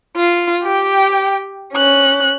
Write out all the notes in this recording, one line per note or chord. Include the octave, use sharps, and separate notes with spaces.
F4
G4 G5
C#4 F#6